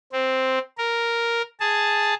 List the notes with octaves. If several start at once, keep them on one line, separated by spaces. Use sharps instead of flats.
C4
A#4
G#4 A5